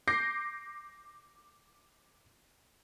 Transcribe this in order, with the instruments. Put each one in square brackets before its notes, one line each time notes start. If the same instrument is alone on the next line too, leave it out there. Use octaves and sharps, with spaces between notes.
[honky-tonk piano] D6 G6 A#6 C7